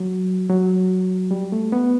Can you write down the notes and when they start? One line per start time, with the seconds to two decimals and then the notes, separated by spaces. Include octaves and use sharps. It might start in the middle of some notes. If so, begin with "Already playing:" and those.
Already playing: F#3
0.49 F#3
1.31 G3
1.52 A3
1.72 B3